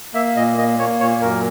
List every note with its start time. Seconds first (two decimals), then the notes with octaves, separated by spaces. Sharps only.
0.14 A#3 E5
0.36 A#2 D#5
0.57 A#3 D#5
0.79 A#3 C#5
1.00 A#2 C#5
1.21 F#2 A#4